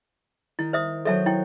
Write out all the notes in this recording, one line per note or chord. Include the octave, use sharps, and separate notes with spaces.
D#3 E4
C5 E5 D#6
D#3 F#3 A4 C5 E5 A5
E4 G5